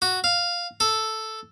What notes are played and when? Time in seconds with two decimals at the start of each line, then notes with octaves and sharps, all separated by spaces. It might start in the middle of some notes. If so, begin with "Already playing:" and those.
0.02 F#4
0.24 F5
0.80 A4